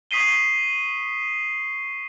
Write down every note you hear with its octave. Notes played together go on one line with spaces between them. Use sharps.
C#6 D#6 B6 C7 D#7 G7